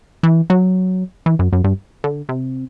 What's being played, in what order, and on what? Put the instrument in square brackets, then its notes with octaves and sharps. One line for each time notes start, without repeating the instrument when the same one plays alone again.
[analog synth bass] E3
F#3
E3
F#2
F#2
G2
D3
C3